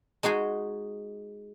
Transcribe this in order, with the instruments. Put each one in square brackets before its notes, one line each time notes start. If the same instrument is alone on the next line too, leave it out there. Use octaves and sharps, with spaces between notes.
[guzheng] G#3 D#4 F#4 G#4